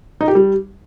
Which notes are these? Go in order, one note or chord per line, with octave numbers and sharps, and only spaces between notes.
D#4
G4
G3